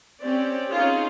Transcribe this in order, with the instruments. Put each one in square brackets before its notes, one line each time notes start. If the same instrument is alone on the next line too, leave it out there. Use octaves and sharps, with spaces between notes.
[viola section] C4 C#4 G4 D5
C#4 D#4 F4 G#4